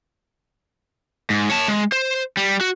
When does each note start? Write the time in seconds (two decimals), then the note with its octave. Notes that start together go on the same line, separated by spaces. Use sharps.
1.30 G#2
1.50 C#5 A5
1.68 G#3
1.92 C5
2.37 G3
2.61 F#4